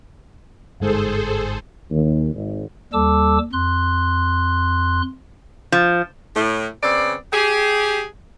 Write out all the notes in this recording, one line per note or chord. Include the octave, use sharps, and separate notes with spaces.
G1 G#2 G#4 A4 C5
D#2
G#1
D#2 G3 A4 A5 D6 E6
F2 C6 F#6
F3
A2
C#3 B3 C4 D5
G4 G#4